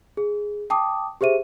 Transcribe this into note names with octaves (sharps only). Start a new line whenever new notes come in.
G#4
G5 A5 D6 D#6
G4 G#4 C5 E5 D#7